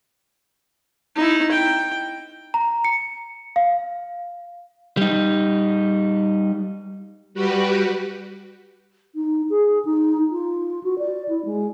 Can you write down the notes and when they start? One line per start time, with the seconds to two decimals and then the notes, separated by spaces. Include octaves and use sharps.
1.16 D#4 E4
1.51 G5
2.54 A#5
2.84 C#7
3.56 F5
4.97 G3 D#4
7.34 G3 F#4 G4 B4
9.15 D#4
9.50 G#4
9.85 D#4
10.31 F4
10.83 F#4
10.99 D5
11.28 E4
11.45 G#3